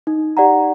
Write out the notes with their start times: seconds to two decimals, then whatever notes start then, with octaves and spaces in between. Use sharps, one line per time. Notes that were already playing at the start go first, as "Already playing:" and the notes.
0.07 D#4
0.37 G4 D5 F#5 A#5